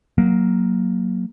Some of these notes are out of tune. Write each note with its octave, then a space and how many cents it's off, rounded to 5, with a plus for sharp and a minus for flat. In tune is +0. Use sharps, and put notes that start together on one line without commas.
F#3 +0 A#3 +0